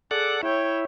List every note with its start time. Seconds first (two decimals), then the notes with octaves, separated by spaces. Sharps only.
0.11 G#4 A4 D5 F#5
0.43 E4 C#5 G5